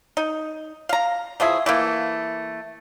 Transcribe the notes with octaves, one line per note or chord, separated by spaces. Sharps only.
D#4
F5 A#5
E3 F3 G#4 E5
E3 A3 A#3